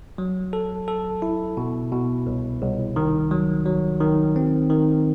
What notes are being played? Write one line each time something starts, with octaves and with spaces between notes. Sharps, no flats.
F#3
A4
A4
E4
B2
B2
C2
C2
D#3
F#3
F#3
D#3
C4
D#3